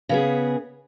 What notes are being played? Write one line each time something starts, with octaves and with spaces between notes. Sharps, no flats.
C#3 B3 G#4